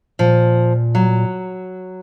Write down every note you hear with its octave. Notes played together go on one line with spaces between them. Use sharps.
A#2 F3
F#3